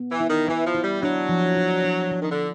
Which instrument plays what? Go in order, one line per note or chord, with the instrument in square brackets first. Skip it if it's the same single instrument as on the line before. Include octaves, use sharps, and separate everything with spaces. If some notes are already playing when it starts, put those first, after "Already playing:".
Already playing: [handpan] B3
[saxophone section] E3
[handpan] E4
[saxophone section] D#3
[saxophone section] E3 [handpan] E4
[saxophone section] F3
[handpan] E4
[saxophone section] G3
[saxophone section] F#3 [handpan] D4
[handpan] F3
D4
D4
F3
[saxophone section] D#3
D3